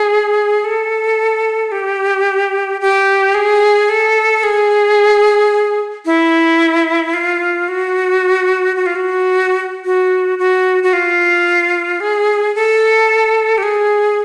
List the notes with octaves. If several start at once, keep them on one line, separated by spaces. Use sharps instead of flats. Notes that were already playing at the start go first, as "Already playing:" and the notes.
Already playing: G#4
A4
G4
G4
G#4
A4
G#4
E4
F4
F#4
F#4
F4
F#4
F#4
F#4
F#4
F4
G#4
A4
G4
G#4